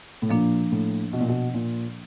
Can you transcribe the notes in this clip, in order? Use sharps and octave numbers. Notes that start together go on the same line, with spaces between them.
A2
A#2 F3 A#3 D4
A2
B2
A#2
B2
A#2